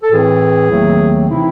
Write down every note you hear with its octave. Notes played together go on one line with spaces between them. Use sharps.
A4
A2 E3 C4 G#4
D#2 D#3 F#3 A3 C4
C3 E3 C4 D#4 E4